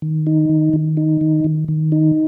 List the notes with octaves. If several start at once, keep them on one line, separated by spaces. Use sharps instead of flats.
D#3
D#4
D#3
D#3
D#4
D#3
D#3
D#3
D#4